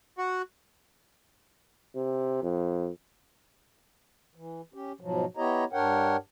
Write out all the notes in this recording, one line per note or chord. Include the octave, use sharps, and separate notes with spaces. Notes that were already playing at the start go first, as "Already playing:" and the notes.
F#4
C3
F2
E3
C#4 G4
G#2 B2 F3 F#3
B3 E4 G4 C#5 D#5 A#5
G2 D4 A#4 C#5 F#5 G5